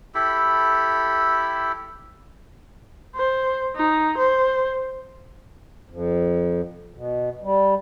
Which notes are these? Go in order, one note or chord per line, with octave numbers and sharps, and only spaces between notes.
E4 G4 A4 B5
C5
D#4
C5
F2
B2
G3